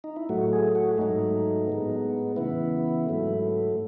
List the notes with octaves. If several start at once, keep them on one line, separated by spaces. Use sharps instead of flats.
D#4
E4
A2 F#3 A3 F#4
G#4
F#4
G#2 F#3 A3 D#4
A2 G#3 B3
C#3 E3 B3 E4
G#2 F#3 A3